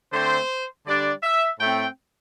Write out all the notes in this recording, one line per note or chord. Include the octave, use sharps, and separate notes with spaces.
D3 A3 C4 C5
D3 G3 D4 D5
E5
A2 A3 C4 G5